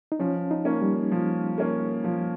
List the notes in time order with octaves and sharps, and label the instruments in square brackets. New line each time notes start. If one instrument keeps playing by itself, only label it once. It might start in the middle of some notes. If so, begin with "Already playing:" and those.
[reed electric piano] D#4
[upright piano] F3 [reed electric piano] C#4
[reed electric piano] D#4
[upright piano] A#3 C#4
[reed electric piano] G3
[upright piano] F3
A#3 C#4
F3